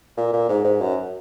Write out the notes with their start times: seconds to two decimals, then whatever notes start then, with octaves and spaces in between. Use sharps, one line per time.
0.17 A#2
0.33 A#2
0.49 G#2
0.65 G#2
0.81 F#2